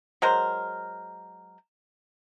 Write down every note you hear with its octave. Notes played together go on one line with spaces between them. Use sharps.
F#3 G#3 A#4 C5